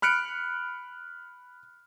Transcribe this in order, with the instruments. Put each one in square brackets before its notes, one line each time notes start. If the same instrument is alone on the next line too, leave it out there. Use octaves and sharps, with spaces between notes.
[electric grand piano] B5 F6 F#6 C#7 D7